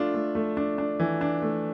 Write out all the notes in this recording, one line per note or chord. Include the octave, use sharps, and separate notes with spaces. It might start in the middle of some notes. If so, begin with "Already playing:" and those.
Already playing: A3 D4 F4
A3
A3
D4
D4
E3
D4
A3